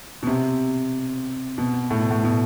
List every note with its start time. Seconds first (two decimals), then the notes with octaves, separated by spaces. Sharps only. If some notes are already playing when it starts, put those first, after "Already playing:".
0.23 B2
0.27 C3
1.58 B2
1.90 A2
2.00 B2
2.11 A2
2.24 B2